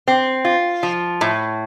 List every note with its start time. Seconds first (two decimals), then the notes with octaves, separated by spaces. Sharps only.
0.08 C4
0.45 F4
0.83 F3
1.21 A2